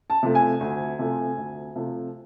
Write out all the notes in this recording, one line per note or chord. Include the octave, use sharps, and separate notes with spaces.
A5
C3 F3 A3
G#5
D2
C3 F3 A3
D2
C3 F3 A3